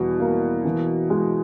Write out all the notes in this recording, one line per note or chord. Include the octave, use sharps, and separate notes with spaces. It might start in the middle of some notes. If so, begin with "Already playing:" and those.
Already playing: E2 B2 E3 G3
A#3
E3
G#3